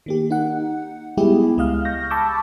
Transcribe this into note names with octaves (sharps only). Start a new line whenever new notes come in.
D#3 A#3 G4
D#4 F#5
G3 G#3 B3 E4 G4 G#4
C#2 G#3 D#5 F5 F6
C#6 F6 G6 A#6
A5 B5 C#6 D6 E6 G6